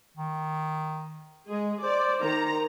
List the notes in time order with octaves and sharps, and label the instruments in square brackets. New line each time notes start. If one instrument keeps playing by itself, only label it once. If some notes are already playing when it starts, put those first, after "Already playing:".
[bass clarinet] D#3
[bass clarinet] G#3 [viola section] G#4
[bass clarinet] C5 [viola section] D5
[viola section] D#3 A#5